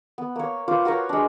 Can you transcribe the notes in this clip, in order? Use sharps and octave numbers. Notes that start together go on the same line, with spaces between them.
B3
A#3 C#5
F4 B4 C5 D6
F#4 A#4 B4 C#5
G#3 D4